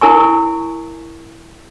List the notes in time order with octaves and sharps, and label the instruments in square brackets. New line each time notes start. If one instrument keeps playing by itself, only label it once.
[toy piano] E4 A#4 G#5 C#6